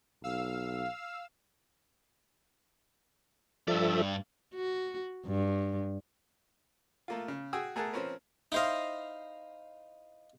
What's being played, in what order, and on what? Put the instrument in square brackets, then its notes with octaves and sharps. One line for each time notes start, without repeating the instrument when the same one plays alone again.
[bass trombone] B1 [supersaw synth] F5 E6
[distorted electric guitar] G2 D5 [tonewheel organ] F3 A4 E5
[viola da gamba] F#4
G2
[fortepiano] A3 A#3 F4
C#3
F#4 G#4 G5 D#6 E6
A3 G#4 A#4 F#5 A5
F3 C4 C#4 A#4 B4
[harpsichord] D#4 F5 [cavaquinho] E4 C5 D#5